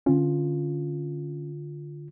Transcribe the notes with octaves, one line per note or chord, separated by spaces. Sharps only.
D3 C#4 F4